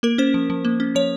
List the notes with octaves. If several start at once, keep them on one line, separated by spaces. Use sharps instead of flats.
A#3 A#4
C#4 C5
F3
F3
A#3
C#4
F3 C#5